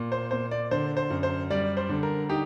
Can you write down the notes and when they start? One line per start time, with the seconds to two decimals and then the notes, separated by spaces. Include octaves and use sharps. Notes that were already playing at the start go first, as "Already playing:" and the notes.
Already playing: A#2
0.12 C5
0.31 A#2 C5
0.51 D5
0.71 D3 C5
0.97 C5
1.10 F#2
1.23 C5
1.51 G3 D5
1.77 C5
1.89 D3
2.03 A#4
2.29 D#4 G4